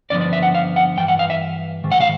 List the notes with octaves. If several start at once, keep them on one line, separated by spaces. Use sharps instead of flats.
G2 D3 F3 B3 D5
D5
E5
F#5
F5
F#5
G2 E3 G5
F#5
F5
E5
G#2 D#3
F#5
F5